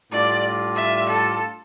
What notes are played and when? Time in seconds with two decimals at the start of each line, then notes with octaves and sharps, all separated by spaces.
0.12 A2 G3 D4 F4 D5
0.76 E5
1.09 A4